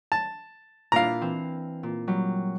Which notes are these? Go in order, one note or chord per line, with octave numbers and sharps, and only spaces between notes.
A5
A#2 D4 E4 F5 A#5
E3 C4
A#2
F#3 G3